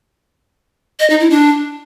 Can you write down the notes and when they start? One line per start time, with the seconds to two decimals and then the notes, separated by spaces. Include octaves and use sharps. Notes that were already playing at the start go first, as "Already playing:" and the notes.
1.00 D#5
1.10 D#4
1.20 E4
1.30 D4